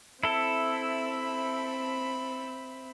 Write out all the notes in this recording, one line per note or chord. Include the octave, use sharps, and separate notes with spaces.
C4 E4 A4 E5 B5